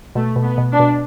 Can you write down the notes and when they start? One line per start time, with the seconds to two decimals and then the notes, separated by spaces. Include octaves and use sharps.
0.15 B2 A3
0.36 B2
0.44 B3
0.58 B2
0.73 D4
0.79 B2